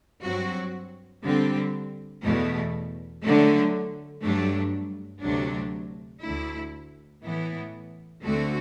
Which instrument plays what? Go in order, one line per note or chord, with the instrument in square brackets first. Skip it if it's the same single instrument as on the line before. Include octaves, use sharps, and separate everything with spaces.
[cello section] G2 F#3 C4 F#4
D3 G3 C4
E2 B2 A3
D3 F#3 A3
G2 F#3 A3 D4
D2 C3 F#3 A3 D4
D2 D3 A3 E4
A2 E3 B3 E4
D2 D3 A3 C4 F#4